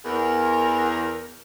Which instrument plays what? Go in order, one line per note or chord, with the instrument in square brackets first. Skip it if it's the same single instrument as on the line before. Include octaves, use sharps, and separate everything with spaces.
[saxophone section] E2 [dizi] A#4